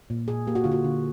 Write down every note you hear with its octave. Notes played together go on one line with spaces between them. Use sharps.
A#2
A#2 G#4
A#3 G4
F#4
D3 F4
F#4
D3